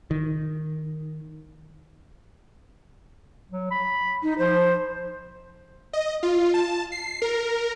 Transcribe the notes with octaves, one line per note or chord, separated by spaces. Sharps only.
D#3
F#3
B5
D#4
F3 C5
D#5
F4
A5
C7
A#4